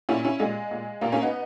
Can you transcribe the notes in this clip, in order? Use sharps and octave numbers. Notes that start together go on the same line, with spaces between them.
A#2 C#4 E4
C#4 E4
A#2 G#3
A#2
A#2 A#3
A#3 C#4
B3 D#4